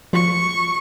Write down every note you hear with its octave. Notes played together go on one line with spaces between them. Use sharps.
F3 C#6